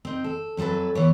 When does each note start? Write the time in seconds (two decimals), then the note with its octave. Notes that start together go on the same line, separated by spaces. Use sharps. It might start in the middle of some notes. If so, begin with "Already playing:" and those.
0.05 C4 D#4
0.24 A4
0.57 F2 F#3 G#4 A4 B4
0.95 E3 B3 C#5